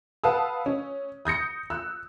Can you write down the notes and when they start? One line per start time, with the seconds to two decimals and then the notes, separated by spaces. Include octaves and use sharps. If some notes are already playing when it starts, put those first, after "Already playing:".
0.24 B4 F5 F#5 A5 D#6 E6
0.66 C#4
1.25 D#6 G6 A#6 C#7
1.70 E6 F#6